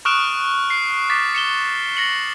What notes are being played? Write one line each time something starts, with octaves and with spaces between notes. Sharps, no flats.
C#6 D#6 F6 F#6 D7 E7
C7
D6 A6 B6
C#7 E7 G7
A#6 C#7 F#7